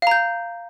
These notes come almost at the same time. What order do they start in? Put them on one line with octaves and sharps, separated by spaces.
F5 A#5 G6